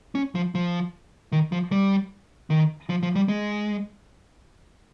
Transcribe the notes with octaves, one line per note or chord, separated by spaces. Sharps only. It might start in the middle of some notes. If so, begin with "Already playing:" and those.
C#4
F3
F3
D#3
F3
G3
D#3
F3
F3
G3
G#3